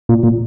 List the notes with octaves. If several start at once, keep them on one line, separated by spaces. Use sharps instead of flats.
A#2
A#2